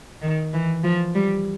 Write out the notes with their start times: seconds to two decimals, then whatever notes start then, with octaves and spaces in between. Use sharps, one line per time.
0.22 D#3
0.53 E3
0.84 F3
1.15 G3